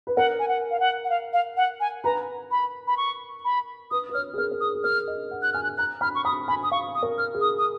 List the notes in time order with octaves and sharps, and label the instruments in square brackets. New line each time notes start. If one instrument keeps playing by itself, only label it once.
[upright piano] B4
[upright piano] A#4 [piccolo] F#5
[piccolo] G#5
F#5
F5
F#5
F#5
F5
F5
F#5
G#5
[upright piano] B4 [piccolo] A#5
[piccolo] B5
B5
C#6
B5
[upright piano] B4 [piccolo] D#6
[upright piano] B4
[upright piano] C#5 [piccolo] F6
[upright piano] G#4
[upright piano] A#4 [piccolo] F6
[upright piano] A#4
[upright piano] G#4 [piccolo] D#6
[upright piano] G#4
[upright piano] A#4 [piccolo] F6
[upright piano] D#5
F#5
[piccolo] F#6
[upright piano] G#5 [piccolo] F6
[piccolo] F#6
[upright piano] A#5 [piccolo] F#6
[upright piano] B5 [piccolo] F6
[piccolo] C#6
[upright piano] B5 [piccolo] D#6
[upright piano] G#5 [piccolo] B5
[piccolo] D#6
[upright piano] F5 [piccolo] C#6
[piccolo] D#6
[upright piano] A#4
[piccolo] F6
[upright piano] G#4
[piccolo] D#6
D#6